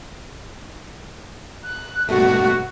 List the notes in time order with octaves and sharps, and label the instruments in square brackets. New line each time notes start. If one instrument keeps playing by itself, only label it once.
[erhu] F#6
[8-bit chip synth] G2 B2 A3 [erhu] F#4